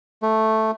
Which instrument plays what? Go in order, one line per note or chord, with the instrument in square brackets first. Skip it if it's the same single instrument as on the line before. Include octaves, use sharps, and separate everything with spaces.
[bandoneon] A3